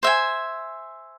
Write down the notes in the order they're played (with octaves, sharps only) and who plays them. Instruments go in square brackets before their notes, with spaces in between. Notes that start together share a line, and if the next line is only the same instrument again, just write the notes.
[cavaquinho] C5 E5 G#5